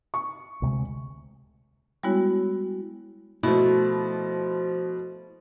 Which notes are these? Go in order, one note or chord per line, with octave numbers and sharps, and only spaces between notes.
C#6
D2 C3 G#3
G3 G#3 B3 E4 F#4 C#5
B2 F3 A3 E4